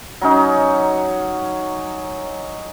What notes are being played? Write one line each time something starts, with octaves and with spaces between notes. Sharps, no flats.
F#3 C#4 D#4